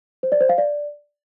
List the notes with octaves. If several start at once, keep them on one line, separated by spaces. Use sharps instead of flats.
C5
D5
C5
F5
D5